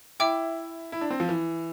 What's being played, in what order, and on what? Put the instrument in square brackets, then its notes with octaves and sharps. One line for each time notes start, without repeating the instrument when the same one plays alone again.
[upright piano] E4 [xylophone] E5 G5 D6
[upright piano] E4
D4
C4
F3
E3